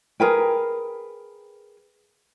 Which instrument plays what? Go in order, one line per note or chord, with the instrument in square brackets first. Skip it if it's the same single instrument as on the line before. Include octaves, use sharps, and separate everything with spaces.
[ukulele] G#4 A#4 B4 G5